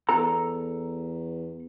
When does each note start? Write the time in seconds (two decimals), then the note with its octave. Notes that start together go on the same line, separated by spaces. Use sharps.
0.09 E2 A4 A#5